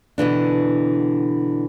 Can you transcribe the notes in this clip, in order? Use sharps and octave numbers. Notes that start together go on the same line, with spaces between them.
B2 D3 E3 D4